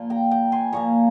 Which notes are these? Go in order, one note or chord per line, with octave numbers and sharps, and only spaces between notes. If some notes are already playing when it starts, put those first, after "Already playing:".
Already playing: A#2 F3 A#3 C6
G5 A#5
G5 A#5
G#5 C6
A#2 F3 A#3 A#5 C#6